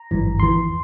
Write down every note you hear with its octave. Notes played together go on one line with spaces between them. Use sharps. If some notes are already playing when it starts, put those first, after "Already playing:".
Already playing: A#5
G#1 G2 E3
E2 E3 C6